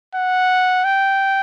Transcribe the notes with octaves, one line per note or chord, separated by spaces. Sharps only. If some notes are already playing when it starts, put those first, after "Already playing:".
F#5
G5